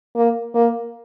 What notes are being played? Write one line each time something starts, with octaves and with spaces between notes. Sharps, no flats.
A#3
A#3